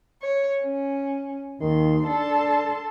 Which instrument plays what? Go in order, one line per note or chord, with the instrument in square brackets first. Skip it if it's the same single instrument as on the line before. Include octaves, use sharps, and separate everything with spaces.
[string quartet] C#5
C#4
[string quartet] D#2 C6 [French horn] D#3
[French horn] D4 [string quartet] A4 A5 C6